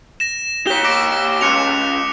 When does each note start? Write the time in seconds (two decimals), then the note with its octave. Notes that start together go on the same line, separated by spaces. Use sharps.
0.20 A#6 E7
0.67 G4 C#5 B6 G7
0.84 D6 A#6 D7
1.41 C#2 F#6 C#7 F7